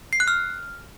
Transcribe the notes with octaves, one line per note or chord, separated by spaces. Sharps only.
C7
F#6
F6